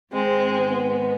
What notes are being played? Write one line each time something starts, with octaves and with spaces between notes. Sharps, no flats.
G#2 D#3 G#3 C4
B3